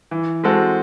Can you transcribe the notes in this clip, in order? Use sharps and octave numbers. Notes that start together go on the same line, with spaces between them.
E3
G#3 C4 F#4 A4